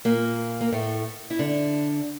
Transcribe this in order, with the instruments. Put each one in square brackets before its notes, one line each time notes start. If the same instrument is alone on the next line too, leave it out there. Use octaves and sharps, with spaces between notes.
[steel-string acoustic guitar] A#2 A#3
A#3
A2 A3
E4
D3 D4